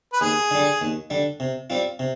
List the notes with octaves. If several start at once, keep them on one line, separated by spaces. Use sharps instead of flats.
B4
D#2 G#4
D3 G3
D#2
D3 G3
C3
G3 C4 F4
C3